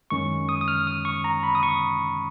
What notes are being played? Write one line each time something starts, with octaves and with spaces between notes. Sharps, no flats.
F#2 D#3 G#3 C#4 C#6
D#6
D#6
F6
D#6
C#6
A#5
B5
D#6
C#6